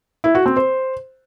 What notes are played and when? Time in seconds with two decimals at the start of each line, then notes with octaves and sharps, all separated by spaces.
0.24 E4
0.35 F#4
0.46 C4
0.57 C5